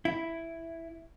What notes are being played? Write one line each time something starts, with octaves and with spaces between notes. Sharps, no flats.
E4